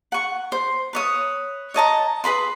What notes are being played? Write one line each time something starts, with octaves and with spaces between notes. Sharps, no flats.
F#5 C#6
C5
B4 C#5 D#6
C#5 D#5 A5 A#5
G#4 B4 B5 C6